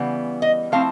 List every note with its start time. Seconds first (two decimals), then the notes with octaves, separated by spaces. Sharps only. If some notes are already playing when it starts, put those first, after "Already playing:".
Already playing: C#3 E3 G3 B3
0.42 D#5
0.72 F3 A3 C4 E4 F5